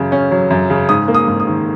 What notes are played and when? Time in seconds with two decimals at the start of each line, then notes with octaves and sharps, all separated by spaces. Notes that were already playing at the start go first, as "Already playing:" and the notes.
Already playing: F#2 C#3 F#3
0.12 C#4
0.31 F#3
0.50 F#2
0.70 C#3
0.89 G#2 D#6
1.08 A#3
1.15 D#6
1.28 G#2
1.40 D#6
1.47 D#3